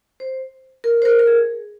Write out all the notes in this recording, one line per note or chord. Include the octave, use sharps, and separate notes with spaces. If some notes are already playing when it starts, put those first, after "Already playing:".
C5
A#4
C5
A#4
A#4
G#4